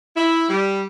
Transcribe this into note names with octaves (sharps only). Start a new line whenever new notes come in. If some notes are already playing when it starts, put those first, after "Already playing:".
E4
G3